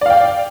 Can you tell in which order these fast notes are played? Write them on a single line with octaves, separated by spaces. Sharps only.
D5 F5 G5